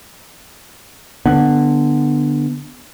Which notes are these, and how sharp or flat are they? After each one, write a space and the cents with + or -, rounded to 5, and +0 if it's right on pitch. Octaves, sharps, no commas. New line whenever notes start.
D3 +15 B3 +0